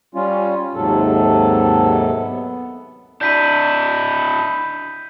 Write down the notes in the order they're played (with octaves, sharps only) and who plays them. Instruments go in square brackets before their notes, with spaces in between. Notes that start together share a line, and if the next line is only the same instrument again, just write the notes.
[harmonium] G3 C#4 F4
D#2 G#2 C3 F#3 A4
B3
[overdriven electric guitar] D4 E4 [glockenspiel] G6 B6 D#7